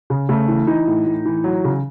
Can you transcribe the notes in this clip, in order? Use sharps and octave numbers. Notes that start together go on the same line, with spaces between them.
C#3
C#3 A3
E3
E3 D#4
A2
A2
E3
F#3
C#3